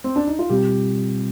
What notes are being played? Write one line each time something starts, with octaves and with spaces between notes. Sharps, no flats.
C4
D4
D#4
F4
B2 G3 C4 G4